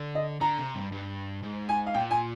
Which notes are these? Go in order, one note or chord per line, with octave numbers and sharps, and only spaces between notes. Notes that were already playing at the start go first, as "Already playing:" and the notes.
Already playing: D3
D#5
D3 A#5
C3
G2
G2
G#2
G#5
F5
A#2 G5
G#5